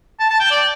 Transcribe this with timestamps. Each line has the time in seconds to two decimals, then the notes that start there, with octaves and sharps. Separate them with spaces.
0.20 A5
0.30 A5
0.40 G5
0.51 D5